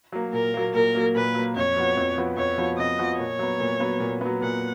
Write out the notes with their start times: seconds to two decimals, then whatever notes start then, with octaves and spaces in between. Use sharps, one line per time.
0.12 F#3 A#3
0.33 A#2 A#4
0.54 F#3 A#3
0.74 A#2 A#4
0.95 F#3 A#3
1.15 A#2 B4
1.35 F#3 A#3
1.56 F2 C#5
1.77 F3 B3 F#4
1.97 F2
2.17 F3 B3 F#4
2.37 F2 C#5
2.58 F3 B3 F#4
2.78 F2 D#5
2.99 F3 B3 F#4
3.19 A#2 C#5
3.39 F#3 B3
3.60 A#2
3.80 F#3 B3
4.00 A#2
4.21 F#3 B3
4.42 A#2 F#5